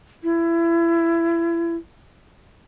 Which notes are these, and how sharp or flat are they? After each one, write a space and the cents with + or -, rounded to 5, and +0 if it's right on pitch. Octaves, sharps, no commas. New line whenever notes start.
E4 +30